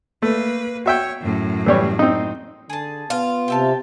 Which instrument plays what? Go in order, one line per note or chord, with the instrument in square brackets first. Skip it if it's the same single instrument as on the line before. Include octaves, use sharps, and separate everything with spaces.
[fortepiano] A3 [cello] A#3 B4
[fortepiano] F#4 E5 G5 [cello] C#5
[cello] F#2 A2
[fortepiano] E3 G3 C#5
C4 D#4
[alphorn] D3 [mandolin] G#4 A5
[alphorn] B3 [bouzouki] F4
[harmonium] C3 [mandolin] G4 E5 A5